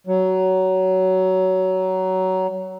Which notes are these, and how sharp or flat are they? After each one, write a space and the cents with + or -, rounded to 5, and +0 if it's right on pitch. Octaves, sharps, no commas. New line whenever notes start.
F#3 +20